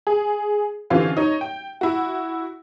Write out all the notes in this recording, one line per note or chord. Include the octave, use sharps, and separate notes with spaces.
G#4
D3 E3 C4 C#4 F4 G4
D#4 C#5
G5
E4 F#4